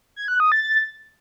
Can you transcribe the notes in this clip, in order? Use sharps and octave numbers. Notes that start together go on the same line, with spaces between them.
G#6
F#6
D#6
A6